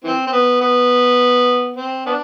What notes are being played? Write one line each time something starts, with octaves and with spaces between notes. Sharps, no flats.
E3 C4
C4
B3
B3
C4
B3 D4